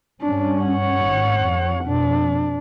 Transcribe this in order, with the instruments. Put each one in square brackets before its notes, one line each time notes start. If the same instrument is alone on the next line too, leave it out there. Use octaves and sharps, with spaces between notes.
[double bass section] G2 C#4 [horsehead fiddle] D4
[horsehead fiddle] C#5 F#5
[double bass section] G#1
F2
[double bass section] F2 B2 [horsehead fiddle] D4